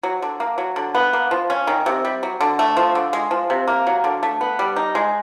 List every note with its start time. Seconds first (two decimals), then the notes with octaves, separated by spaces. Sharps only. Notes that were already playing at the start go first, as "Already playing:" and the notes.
0.03 F#3
0.22 D3
0.40 A#3
0.58 F#3
0.76 D3
0.95 B3
1.13 A#3
1.31 F3
1.50 C#4
1.67 D#3
1.86 C3
2.05 G3
2.23 F#3
2.41 D3
2.59 A3
2.77 F3
2.95 D3
3.13 G#3
3.31 F3
3.50 C3
3.68 A#3
3.87 F#3
4.04 D3
4.23 A3
4.41 B3
4.59 G3
4.76 D#4
4.95 G#3